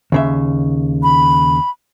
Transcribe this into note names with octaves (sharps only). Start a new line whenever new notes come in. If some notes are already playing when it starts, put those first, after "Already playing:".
D#2 C#3 E5
B5